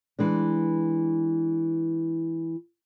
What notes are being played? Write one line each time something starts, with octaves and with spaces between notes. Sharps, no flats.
E3 G#3 D4